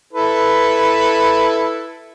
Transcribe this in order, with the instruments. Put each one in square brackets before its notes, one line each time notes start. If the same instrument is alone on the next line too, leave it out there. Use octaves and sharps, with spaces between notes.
[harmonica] E4 A4 B4